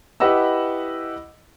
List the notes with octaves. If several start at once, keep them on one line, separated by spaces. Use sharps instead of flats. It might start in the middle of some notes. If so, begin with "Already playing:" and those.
E4 G4 B4 D#5 F#5 E6